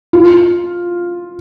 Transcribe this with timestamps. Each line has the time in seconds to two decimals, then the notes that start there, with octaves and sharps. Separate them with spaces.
0.13 F4